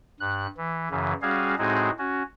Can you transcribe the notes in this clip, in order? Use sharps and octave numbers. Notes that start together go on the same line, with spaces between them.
G2 F#6
E3
F#2 C#3 E3
G3 C#4 F#4 G#4 F5
A2 G#3 C4 D#4 F#4 G#4
C#4 F#4